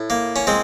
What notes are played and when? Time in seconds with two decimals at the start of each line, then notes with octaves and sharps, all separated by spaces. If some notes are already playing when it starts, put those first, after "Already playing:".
Already playing: A2
0.10 A#3
0.36 C#4
0.47 G#3 C4